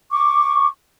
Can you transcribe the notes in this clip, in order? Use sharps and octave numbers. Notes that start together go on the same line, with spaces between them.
C#6 D6